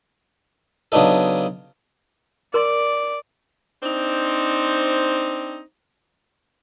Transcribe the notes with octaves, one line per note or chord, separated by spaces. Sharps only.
C#3 F#3 B3 D4 D#4 A4
A#4 D5 C6 C#6
C4 D4 D#4 C5